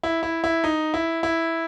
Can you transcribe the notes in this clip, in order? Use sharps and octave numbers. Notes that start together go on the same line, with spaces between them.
E4
E4
E4
D#4
E4
E4